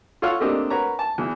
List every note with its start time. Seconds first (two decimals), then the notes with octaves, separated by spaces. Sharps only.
0.22 F4 A4 C#5 F5 F#5 F6
0.40 A3 A#3 C4 D4 G4 D#5
0.70 F#4 A#4 B4 C#5 A#5
0.99 A5
1.18 E2 E3